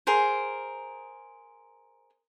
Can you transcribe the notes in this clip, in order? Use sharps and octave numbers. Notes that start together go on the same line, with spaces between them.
G#4 A#4 C5